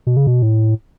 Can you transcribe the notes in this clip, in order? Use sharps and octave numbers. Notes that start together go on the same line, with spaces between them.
B2
C#3
B2
A2